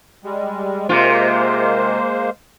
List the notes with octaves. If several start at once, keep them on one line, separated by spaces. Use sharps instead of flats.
G3 G#3
C3 G#3 A#3 F4 C5